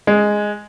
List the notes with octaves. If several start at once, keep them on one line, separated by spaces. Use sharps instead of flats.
G#3